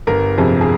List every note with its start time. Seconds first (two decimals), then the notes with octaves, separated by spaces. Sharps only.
0.07 G1 A#4
0.38 F2 C3 G#4
0.61 G#4